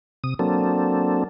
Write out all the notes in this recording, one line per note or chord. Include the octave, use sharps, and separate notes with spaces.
C3 D#6
F#3 A#3 C4 D4 A4